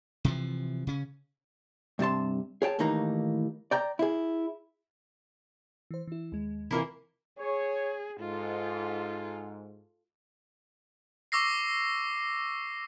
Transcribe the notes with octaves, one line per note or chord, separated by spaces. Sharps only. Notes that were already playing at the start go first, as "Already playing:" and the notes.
C3 E3 F3
C#3 C#4
G2 C3 D#4 A5 C6
G#4 C#5 G5 A5
D#2 A2 E3 A#3 D#4 A#5
D5 G5 A#5
E4 G#4
E3 C5
E3 E4
D#2 G#3
C3 E3 A#3 C4 E4 F4
G#4 C#5
G#2 F4 A4
C#6 D6 E6 A#6 C7